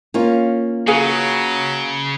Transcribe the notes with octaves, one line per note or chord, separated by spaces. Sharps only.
A#3 C#4 F4
C#3 F#3 G#4 B4 F5